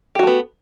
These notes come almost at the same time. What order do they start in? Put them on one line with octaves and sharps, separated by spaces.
G4 F#4 A3 B3